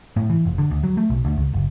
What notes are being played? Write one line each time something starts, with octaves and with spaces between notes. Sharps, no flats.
A2
E3
F1
D3
D2
F#3
A3
B1
D2
C#2
F#1